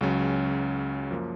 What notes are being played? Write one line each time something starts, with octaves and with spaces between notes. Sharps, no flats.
C#2 C#3 F#3 C#4
F#2 F3 A#3